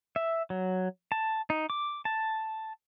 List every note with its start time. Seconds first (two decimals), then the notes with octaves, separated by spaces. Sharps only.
0.16 E5
0.50 F#3
1.12 A5
1.50 D#4
1.70 D6
2.05 A5